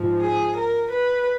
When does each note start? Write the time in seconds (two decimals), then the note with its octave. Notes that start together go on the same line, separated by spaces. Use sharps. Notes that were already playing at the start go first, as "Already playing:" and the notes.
Already playing: G#2 F3
0.21 G#4
0.55 A#4
0.90 B4